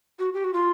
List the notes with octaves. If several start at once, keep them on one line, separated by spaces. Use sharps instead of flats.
F#4
G4
F#4
F4